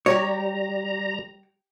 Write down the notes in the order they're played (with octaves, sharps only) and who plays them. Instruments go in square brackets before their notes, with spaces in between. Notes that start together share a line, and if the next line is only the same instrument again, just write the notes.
[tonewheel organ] G3 A#5 [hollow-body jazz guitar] G4 C#5